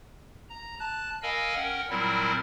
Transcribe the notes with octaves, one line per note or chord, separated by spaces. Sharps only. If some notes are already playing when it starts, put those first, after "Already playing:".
A#5
A5 F#6
A#4 D#5 F5 G#5 B5 E6
C#4 A#4 F#5 G5
A#2 F#3 G3 C4 E4 A#4